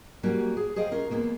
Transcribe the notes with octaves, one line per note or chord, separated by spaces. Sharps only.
F#3 G3 A#3 C#4 F#4
G#4
G#4 C5 D#5 F5 G5
C#4 F4 A#4
E2 A#2 G#3 A#3 B3